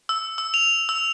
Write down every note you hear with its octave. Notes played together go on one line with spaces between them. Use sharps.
E6
E6
F7
E6